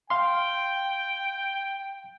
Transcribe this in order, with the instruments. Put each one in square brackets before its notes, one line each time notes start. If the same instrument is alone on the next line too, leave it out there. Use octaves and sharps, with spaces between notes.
[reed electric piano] F5 C6 [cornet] G5